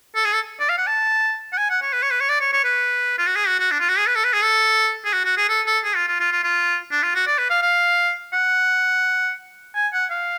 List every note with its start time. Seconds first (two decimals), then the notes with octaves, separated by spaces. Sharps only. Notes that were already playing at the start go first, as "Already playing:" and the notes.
0.15 A4
0.25 G#4
0.33 A4
0.60 D5
0.69 F5
0.78 F#5
0.87 A5
1.53 F#5
1.58 G#5
1.70 F#5
1.82 C#5
1.93 B4
2.03 C#5
2.11 B4
2.20 C#5
2.29 D5
2.41 C#5
2.53 C#5
2.64 B4
3.19 F4
3.27 F#4
3.36 G#4
3.47 F#4
3.59 F#4
3.71 D4
3.80 F4
3.89 F#4
3.98 G#4
4.07 B4
4.15 A4
4.24 B4
4.33 G#4
4.42 A4
5.05 G#4
5.13 F#4
5.25 F#4
5.37 G#4
5.49 A4
5.67 A4
5.84 G#4
5.96 F4
6.08 F4
6.20 F4
6.32 F4
6.44 F4
6.91 D4
7.03 F4
7.15 F#4
7.27 D5
7.38 B4
7.50 F5
7.62 F5
8.33 F#5
9.75 G#5
9.93 F#5
10.11 F5